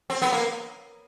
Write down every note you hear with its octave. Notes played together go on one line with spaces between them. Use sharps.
C4
B3
A#3